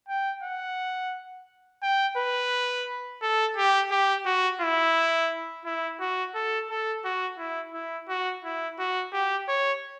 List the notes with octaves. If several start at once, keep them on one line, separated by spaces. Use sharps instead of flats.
G5
F#5
G5
B4
A4
G4
G4
F#4
E4
E4
F#4
A4
A4
F#4
E4
E4
F#4
E4
F#4
G4
C#5